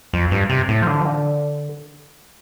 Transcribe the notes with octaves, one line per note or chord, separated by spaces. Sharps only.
F2
G2
C3
A2
F3
D3
F3
D3